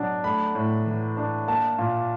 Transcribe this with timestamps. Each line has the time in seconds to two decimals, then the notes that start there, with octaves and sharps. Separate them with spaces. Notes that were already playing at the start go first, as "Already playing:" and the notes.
Already playing: B2 F#3 D4
0.24 A3 B5
0.55 A2
0.86 E3
1.17 D4
1.48 A#3 A5
1.78 A#2